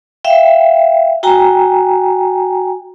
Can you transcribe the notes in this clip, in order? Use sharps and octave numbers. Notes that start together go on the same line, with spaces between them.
E5 F5 G5
F#4 G5 G#5 A#5